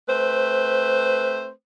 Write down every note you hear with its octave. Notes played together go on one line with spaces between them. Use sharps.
A3 C4 B4 C5